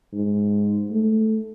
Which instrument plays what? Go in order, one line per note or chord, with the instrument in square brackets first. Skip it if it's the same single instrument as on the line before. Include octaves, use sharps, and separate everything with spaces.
[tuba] G#2
A3